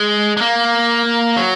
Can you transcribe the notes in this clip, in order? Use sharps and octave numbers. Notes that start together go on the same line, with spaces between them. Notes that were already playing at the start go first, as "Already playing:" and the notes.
Already playing: G#3
G#3
A#3
F#3